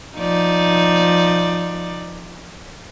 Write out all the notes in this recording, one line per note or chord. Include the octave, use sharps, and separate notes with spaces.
F3 D#4 D5